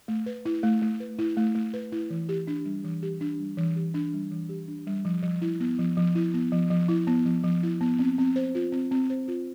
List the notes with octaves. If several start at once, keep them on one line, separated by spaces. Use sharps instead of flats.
A3
B4
E4
A3
A3
B4
E4
A3
A3
B4
E4
E3
G4
D4
G3
E3
G4
D4
G3
E3
G4
D4
G3
E3
G4
D4
G3
F3
F3
E4
B3
F3
F3
E4
B3
F3
F3
E4
B3
F3
F3
E4
B3
C4
C4
C5
F4
C4
C4
C5
F4